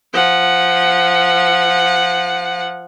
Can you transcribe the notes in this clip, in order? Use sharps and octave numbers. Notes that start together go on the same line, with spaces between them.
F3 F#5